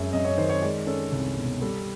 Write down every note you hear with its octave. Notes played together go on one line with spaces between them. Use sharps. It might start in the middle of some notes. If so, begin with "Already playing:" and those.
Already playing: F#2 G#3 E5
F#2 D#5
C#5
D#3 C5
C#5
G#3 D5
C#4 A4
C2
B2
G3 A4